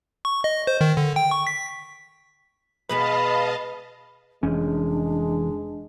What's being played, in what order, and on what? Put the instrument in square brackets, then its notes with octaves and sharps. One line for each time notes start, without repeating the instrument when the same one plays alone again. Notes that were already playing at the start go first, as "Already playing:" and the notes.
[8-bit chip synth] C#6
D#5
C5
D#3
D3
G5
C#6
B6
[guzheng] B2 G#3 B3 [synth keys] B4 [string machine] D#5 F5 A5 [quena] B5
[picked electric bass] F1 C#4 [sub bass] E3 [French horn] G#3 [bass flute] D4